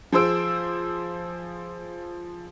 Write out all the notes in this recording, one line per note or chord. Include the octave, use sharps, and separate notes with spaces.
F3 G#4 C5 E6 D7